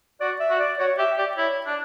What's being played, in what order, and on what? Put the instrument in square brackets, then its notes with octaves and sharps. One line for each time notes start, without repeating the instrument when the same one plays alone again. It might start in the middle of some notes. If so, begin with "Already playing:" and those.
[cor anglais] F#4 [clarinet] D5
[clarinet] E5
[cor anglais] F#4
[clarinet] D5
[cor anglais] F#4 [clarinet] C#5
[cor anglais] G4 [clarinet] E5
[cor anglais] G4 [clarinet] D5
[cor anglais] E4 [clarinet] C#5
[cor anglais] D4 [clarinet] D5